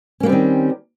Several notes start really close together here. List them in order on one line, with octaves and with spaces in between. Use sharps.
C#4 A#3 G3 C4 D#3